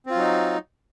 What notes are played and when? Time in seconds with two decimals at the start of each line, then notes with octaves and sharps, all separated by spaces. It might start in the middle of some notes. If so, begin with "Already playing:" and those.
0.07 C4
0.11 F4
0.15 F#3
0.19 D#4